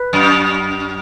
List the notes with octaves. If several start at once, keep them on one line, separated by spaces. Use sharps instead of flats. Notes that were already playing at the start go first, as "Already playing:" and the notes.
Already playing: B4
F#2